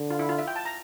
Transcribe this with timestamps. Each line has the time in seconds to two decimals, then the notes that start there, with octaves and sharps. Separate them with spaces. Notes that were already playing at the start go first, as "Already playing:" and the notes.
Already playing: D3
0.10 F4
0.19 E4
0.29 F4
0.38 E5
0.48 G5
0.56 A5
0.65 A#5